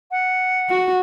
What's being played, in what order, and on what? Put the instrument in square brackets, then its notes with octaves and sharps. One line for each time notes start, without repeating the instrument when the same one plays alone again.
[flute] F#5
[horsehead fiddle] F#4